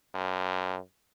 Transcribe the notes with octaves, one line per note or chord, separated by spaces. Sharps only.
F#2